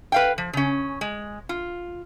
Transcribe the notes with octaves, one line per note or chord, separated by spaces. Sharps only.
B4 F5 G5
F3
C#3 C#4
G#3
F4